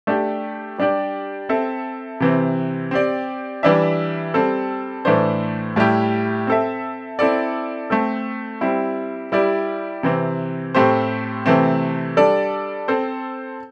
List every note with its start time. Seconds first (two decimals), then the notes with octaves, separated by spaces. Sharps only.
0.07 A3 D4 G4
0.78 G3 D4 G4 D5
1.49 C4 A4 E5
2.20 C3 E3 C4
2.91 C4 G4 D5
3.63 E3 G3 D4 G4 E5
4.34 G3 C4 A4
5.05 A2 E3 A3 D4 C5
5.76 A2 G3 E4 G4
6.47 C4 A4 E5
7.19 C4 E4 A4 D5
7.90 A3 C4 A4
8.61 G3 C4 E4
9.32 G3 E4 G4 D5
10.03 C3 E3 C4
10.74 A2 A3 C4 G4 C5
11.46 C3 E3 A3 C4
12.17 G3 D4 A4 D5
12.88 C4 A4 C5